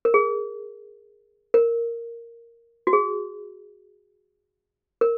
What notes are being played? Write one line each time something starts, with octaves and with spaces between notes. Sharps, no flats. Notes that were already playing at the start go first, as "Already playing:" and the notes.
A#4
G#4
A#4
F#4
G#4
A#4